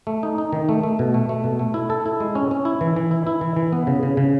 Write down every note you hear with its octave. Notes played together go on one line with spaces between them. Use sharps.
A3
D#4
D#4
D#3
A3
A3
B2
A3
A3
B2
A3
E4
A4
E4
G#3
C#4
C#4
E4
E3
E3
E4
E4
E3
E3
B3
C#3
C#3
C#3